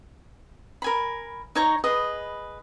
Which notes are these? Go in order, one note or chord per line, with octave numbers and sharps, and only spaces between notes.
A#4 G#5 B5
D#4 C#5 A#5 C#6
G#4 B4 D#5 D#6